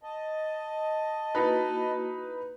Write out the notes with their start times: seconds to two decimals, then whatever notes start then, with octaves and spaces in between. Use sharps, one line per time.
0.03 D#5 A5
1.35 A#3 D#4 E4 F#4 B4